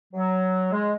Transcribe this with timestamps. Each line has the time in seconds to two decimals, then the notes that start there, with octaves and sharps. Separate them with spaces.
0.13 F#3
0.72 G#3